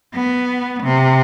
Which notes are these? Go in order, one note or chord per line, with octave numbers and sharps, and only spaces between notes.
B3
C3